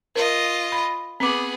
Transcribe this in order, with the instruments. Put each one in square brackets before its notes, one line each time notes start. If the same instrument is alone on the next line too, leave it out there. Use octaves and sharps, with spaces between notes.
[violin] F4 D#5 [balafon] A#4
[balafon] B5
[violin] B3 G#4 [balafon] C4 D6